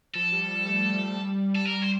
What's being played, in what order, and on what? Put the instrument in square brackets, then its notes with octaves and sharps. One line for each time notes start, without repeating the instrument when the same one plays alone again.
[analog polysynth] F3 [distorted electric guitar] A4
[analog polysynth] G3
G3
A3
G3
G3
[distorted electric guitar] A4
A#4
C5